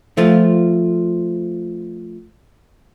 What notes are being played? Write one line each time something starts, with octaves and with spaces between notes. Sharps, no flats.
F3 A3 F4